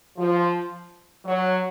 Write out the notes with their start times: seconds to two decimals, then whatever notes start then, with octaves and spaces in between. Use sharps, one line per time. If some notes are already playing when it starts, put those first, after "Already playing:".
0.18 F3
1.25 F#3